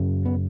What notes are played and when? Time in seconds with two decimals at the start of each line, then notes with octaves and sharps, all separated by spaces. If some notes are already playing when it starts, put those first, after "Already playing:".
Already playing: F#2 C#3
0.26 B3